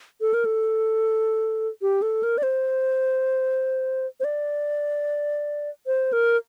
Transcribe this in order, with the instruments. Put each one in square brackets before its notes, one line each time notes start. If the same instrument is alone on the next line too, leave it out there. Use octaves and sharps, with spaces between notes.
[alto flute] A4
A#4
A4
G4
A4
A#4
D5
C5
C5
D5
C5
A#4